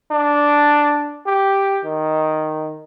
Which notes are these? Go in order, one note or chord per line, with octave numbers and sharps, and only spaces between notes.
D4
G4
D#3